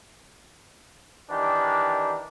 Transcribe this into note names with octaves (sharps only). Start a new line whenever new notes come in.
D#3 E3 D4 G4